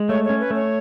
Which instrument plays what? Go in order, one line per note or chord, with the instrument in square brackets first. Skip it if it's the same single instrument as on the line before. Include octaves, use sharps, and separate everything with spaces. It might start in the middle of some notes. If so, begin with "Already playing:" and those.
Already playing: [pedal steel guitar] G#3
[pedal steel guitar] A3 [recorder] C#5
[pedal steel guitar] C#4 [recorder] C#5
[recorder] B4
[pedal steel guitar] A3 [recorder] C#5